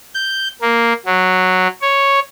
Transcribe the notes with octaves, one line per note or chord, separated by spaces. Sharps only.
G6
A#3
F#3
C#5